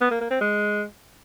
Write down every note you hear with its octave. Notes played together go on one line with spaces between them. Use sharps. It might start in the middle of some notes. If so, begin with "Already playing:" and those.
B3
A#3
A#3
C4
G#3